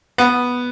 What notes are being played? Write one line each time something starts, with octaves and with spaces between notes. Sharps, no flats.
B3